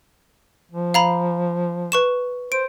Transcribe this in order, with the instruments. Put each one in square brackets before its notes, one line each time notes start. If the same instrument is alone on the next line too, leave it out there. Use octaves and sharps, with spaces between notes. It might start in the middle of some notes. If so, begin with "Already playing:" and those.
[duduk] F3
[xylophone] F5 A#5 B5
B4 C#6 E7
[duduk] C5 [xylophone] D7